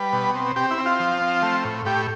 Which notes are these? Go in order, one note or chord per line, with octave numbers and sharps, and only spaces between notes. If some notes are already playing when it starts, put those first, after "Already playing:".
Already playing: G3 B4
B2
C4
C4 G4
E4
C4
F4
F3
C4
A3
A2
A2 G4